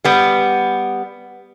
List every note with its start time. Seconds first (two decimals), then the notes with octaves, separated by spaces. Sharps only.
0.04 G3 B3